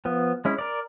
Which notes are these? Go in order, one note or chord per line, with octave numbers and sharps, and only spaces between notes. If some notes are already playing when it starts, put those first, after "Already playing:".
F3 B3
G#3 C#4 E4
A#4 D5